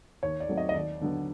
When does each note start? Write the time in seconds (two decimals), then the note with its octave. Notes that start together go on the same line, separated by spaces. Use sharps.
0.23 D#2 C#5
0.40 D5
0.48 D#3 F#3 A3 C4
0.57 D#5
0.69 D#5
0.74 D#2 D5
1.01 D3 F#3 B3